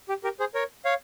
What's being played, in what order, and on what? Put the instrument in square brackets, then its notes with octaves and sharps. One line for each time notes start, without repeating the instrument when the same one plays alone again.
[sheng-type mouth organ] G4
G4 A#4
G#4 C5
A#4 C#5
C#5 F5